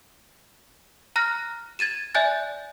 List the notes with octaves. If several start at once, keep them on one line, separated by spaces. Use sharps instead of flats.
A#5 F6 F#6 A#6
G#6 A6 D#7 E7
D5 E5 G#5 F#6 G6 A6